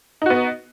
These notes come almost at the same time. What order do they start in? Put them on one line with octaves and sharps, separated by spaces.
D#4 F#4 B3